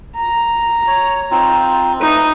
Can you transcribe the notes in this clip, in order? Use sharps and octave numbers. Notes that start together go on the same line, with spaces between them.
A#5
C#5
C4 D#4 F4
A3 D#4 B4